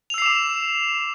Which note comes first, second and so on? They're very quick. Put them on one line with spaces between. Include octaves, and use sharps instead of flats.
F7 E6 C7 D6 E7